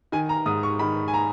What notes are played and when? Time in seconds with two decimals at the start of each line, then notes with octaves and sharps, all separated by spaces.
0.12 D#3 G#5
0.29 A#5
0.46 G#2 D#6
0.63 C#6
0.79 D#3 B5
1.08 G#5
1.14 A#5